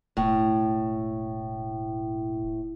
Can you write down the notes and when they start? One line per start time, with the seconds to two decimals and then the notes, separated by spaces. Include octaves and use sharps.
0.17 E1 A2